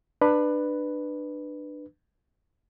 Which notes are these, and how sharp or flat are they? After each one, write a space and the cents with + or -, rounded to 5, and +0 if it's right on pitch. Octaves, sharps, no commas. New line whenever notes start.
D4 +25 B4 +0